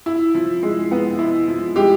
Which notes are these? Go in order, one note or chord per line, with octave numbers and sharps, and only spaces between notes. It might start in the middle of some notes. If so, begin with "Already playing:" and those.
E4
F3
G#3
B3
E4
F3
G#3 G4